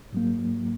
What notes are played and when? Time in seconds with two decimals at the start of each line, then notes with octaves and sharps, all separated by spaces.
0.13 G#2 F#3 A#3